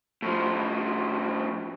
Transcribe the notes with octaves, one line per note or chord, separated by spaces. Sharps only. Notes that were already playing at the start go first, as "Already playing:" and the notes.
A2 F3